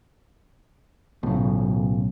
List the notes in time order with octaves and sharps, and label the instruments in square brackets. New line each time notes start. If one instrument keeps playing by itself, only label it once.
[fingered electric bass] B1 [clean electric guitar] A2 C#3